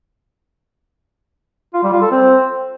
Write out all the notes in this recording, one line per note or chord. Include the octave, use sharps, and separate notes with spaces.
F4
G3
F4
A4
C4